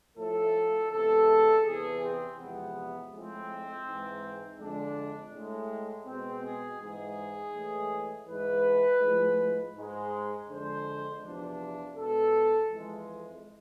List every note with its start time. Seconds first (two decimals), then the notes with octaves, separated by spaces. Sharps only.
0.16 A2 F3 A3 A4
0.90 E2 C3 G#3 A4
1.64 E2 C3 E3 G#4
2.02 C4
2.38 E2 C3 F3 G#3 B3
3.12 A2 F3 G#3 C4
3.85 G#2 E3 G#3
4.59 F2 D3 G#3 D4
5.33 A2 G#3
6.06 B2 G#3 C4
6.43 G#4
6.80 G#2 E3 G#3 G#4
7.53 A2 E3 G#3
8.28 G#2 E3 G#3 B4
9.01 A2 F3 G#3
9.76 G#2 G#3
10.49 F2 D3 G#3 C5
11.22 E2 C3 F3 D4
11.95 B2 G#3 A4
12.70 F2 E3 G#3